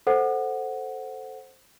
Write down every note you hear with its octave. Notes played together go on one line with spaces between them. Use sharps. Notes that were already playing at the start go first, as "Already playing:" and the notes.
A4 C5 F#5